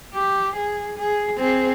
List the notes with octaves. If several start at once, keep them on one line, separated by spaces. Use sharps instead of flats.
G4
G#4
G#4
C4 G#4